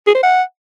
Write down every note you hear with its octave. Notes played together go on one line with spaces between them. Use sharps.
G#4
C5
F#5